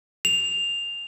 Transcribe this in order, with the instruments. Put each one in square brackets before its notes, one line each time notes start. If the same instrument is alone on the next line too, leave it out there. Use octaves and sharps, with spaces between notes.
[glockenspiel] F7